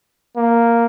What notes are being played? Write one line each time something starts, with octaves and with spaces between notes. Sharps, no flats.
A#3